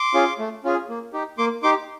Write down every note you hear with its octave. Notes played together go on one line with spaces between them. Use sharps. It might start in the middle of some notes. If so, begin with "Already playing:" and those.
Already playing: C6 D6
C#4 F4 G#4
A3
C#4 F4 G#4
A#3
D#4 G4
A#3 C6 D6
D#4 G4 C6 D6